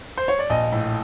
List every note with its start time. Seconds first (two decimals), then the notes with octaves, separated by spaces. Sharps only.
0.17 C5
0.28 C#5
0.39 D5
0.50 A#1 D#5
0.72 A2